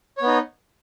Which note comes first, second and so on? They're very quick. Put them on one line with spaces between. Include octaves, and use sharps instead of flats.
C#5 B3 D#4